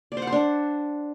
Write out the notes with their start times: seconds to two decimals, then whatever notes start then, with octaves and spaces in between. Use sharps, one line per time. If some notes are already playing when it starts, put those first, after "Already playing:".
0.12 D5
0.17 C5
0.22 F#5
0.27 C5
0.32 D4